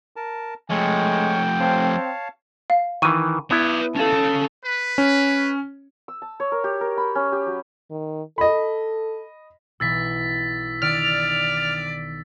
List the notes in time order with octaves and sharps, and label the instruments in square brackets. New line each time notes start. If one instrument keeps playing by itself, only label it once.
[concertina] A#4 A5
[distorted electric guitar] F3 A3 [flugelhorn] G#3 [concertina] C#5 C#6 [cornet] G5
[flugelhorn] C4 [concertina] C#5 F5 A5
[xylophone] F5
[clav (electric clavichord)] D#3 E3 [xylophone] C#6 D#7
[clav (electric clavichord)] B3 E4 [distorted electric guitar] B4 D5
[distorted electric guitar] C#4 F5 [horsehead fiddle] A4
[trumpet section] B4
[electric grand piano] C#4
[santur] E6
A5
C#5
A#4
G4
A#4
B5
C#4
G4
F#3
[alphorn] D#3
[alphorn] A4 [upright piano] D#5 B5
[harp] B1 E3 [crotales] E6 A6 B6
[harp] D#3 D4 [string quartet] D5 [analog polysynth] F6